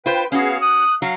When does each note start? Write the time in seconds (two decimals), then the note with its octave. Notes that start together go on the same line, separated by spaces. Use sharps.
0.06 F4 B4 C5 G5
0.32 B3 C#4 F#4 G#4 F5
0.62 D#6 F#6
1.02 F#3 F5